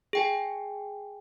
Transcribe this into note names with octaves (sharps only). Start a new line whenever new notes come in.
G#4 G5 G#5